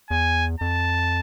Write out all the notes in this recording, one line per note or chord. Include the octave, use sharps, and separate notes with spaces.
E2 G#5
F2 A5